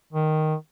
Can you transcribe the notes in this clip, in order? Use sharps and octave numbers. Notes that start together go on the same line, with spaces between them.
D#3